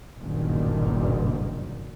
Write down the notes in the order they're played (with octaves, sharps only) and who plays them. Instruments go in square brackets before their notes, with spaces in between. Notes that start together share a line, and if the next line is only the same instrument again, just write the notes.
[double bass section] F#1 B1 G2 A#2 D3 D#3